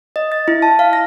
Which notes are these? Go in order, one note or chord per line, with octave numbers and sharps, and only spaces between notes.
D#5
A6
E4
A5
F5
A#6